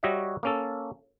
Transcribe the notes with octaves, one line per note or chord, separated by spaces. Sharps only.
G3 F#4 C#5 D#5 E5 F#5
A#3 C#4 A4